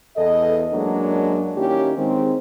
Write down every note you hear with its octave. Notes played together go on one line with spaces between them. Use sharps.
E2 A4 D#5
F#2 F#3 G#3 A#3 D4
D#3 A#3 C#4 E4 G4
D#3 G#3 C4